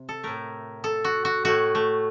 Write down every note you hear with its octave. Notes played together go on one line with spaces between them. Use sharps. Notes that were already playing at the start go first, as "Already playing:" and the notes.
Already playing: C3
A4
A2 A3 A#4
A4
F#4
F#4
A2 A3 F#4
A3